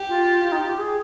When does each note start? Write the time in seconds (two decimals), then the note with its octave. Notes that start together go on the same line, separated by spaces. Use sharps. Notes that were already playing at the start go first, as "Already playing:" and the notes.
Already playing: G4
0.09 F4
0.44 F4
0.52 D#4
0.61 F4
0.69 G4
0.78 G#4